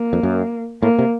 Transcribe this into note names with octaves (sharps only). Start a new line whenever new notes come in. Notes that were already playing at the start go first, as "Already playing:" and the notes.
Already playing: A#3
F2
F#2
A2 A#3
C3